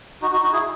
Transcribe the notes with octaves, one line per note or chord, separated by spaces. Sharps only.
D#4 F#4
D#4 F#4
D#4 F#4
E4 G#4